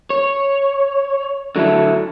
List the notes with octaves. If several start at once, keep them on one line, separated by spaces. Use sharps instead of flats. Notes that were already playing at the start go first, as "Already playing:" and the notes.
C#5
D3 F#3 A3 E4